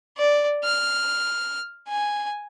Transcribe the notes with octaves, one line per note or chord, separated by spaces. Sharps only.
D5
F6
G#5